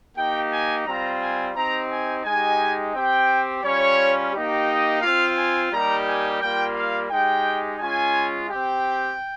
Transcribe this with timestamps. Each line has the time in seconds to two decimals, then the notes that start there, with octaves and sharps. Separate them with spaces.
0.16 A#3 D#4 G4 G5
0.51 G#5
0.86 G3 C4 F4 A#5
1.21 G#5
1.55 C4 D#4 G4 A#5
1.90 G#5
2.24 G#3 D#4 G4 G#5
2.94 C4 G4 G5
3.63 G3 C#4 F4 C#5
4.34 A#3 D#4 G4
4.68 D#5
5.02 C4 F4 F5
5.36 G#5
5.72 G3 A#3 D#4 G4 A#5
6.06 G#5
6.40 G3 A#3 F4 G5
6.75 F5
7.10 G#3 D#4 G4 G5
7.79 G#3 C#4 F4 G#5
8.49 C4 G4 G5